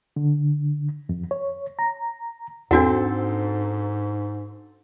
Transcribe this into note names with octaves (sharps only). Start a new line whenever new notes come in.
D3
F2
C#5
A#5
E2 G#2 C4 D4 F#4 A4 F#5